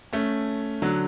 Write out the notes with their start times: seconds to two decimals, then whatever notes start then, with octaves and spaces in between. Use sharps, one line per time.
0.13 A3 C#4
0.82 D3 F#3